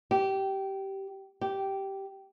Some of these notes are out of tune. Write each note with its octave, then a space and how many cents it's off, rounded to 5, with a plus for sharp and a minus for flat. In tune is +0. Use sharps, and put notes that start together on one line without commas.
G4 -15
G4 -10